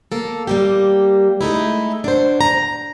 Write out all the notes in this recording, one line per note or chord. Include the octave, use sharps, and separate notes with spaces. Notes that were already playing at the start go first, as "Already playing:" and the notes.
A#3 A4
G3 A#3 G4
G#3 A3 D#4 E4
D4 F#4 C5
A#5